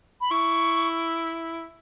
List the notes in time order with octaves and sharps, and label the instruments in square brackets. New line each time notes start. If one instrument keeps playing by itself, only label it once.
[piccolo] B5
[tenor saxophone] E4 [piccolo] C#6